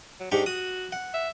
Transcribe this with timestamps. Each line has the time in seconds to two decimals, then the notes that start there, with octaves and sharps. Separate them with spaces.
0.20 F#3
0.32 G#2 D4 G4 C#6
0.46 F#4 D#6
0.92 F#5
1.14 E5